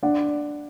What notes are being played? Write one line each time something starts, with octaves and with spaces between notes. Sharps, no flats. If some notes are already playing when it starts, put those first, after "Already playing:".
D4 F#5